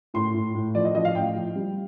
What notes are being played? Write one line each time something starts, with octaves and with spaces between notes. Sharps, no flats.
A2 C6
A2
A2
F3 D5
D#5
F3 D#5
F5
A2 G5
F3
G3